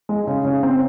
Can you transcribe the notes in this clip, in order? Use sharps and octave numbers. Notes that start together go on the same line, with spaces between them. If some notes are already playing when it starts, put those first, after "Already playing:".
G#3
C#3
C#3
C4